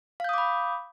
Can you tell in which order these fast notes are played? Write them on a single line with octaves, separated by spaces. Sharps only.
F5 G6 D#6 D6 B5